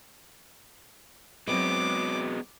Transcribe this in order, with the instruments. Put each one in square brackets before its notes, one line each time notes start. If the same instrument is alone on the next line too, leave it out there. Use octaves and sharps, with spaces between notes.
[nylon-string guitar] F#3 C4 B4 [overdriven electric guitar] G#3 B3 [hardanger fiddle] D6